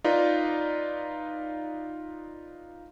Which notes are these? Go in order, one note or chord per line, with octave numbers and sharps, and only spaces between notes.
D#4 F4 B4 D5